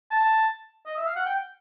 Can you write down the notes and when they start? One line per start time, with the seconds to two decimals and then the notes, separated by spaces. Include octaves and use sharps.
0.11 A5
0.86 D#5
0.97 E5
1.06 F5
1.16 F#5
1.26 G5